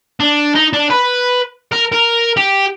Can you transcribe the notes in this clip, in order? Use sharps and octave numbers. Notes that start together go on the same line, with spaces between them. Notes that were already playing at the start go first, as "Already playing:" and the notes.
D4
D#4
D4
B4
A#4
A#4
G4